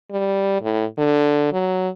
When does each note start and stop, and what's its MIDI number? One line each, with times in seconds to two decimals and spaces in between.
0.11 0.61 55
0.62 0.84 45
0.98 1.52 50
1.53 1.89 54